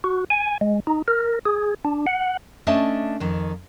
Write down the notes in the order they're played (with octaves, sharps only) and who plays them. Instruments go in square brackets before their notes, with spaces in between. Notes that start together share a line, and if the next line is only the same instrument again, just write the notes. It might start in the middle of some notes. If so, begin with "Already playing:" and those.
[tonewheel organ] F#4
G#5
G#3
D#4
A#4
G#4
D4
F#5
[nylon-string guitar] A3 C#4 D4 D#5 E5 A5
F2 D#3